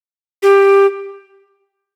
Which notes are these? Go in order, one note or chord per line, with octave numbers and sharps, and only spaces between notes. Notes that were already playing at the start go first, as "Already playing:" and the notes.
G4